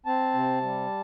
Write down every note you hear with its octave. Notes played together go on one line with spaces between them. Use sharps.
C4 A5
C3
G3